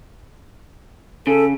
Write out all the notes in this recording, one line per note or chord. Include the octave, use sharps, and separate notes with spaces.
C#3 A4